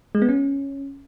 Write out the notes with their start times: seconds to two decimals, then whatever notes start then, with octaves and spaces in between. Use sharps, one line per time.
0.15 G#3
0.22 B3
0.29 C#4